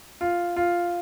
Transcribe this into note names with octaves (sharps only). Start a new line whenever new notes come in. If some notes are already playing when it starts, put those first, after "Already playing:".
F4
F4